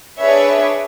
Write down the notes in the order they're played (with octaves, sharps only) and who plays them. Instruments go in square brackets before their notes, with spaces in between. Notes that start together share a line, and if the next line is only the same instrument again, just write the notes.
[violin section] D4 G#4 B4 C#5 E5